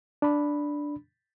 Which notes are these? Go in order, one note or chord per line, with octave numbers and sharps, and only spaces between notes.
D4 B5